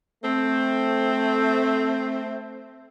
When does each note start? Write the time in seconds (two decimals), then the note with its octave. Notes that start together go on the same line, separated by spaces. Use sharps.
0.23 A3 C4